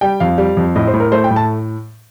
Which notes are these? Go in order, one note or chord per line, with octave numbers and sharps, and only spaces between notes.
G3 G5
F2 F5
G3
F2
A2 D#5
C5
A2
A#4
A3 C5
G5
A2
A5